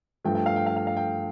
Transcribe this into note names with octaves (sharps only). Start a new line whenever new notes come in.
G2 F3 A3 G5
G5
F5
G5
F5
F5
F5
G5